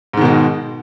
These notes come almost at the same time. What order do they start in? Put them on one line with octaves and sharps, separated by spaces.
G#2 D#3 B2 G#3